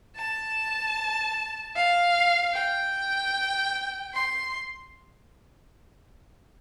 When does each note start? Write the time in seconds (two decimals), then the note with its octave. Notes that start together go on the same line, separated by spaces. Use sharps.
0.16 A5
1.76 F5
2.54 G5
4.13 C6